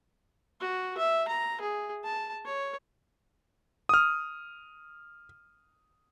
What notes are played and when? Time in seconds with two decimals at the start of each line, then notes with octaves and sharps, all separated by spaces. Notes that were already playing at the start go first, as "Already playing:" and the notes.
0.60 F#4
0.98 E5
1.28 A#5
1.61 G#4
2.04 A5
2.45 C#5
3.89 D#6 F6